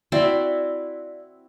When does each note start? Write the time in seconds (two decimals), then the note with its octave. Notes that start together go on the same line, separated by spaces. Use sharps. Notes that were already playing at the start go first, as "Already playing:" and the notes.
0.12 C4 E4 F#4 D5 E5 F#5